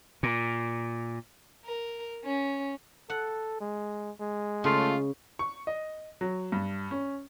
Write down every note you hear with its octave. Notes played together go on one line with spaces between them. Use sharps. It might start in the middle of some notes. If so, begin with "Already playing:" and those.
A#2
A#4
C#4
A4 F#5
G#3
G#3
C#3 A3 F4
C#6
D#5
F#3
G2
C#4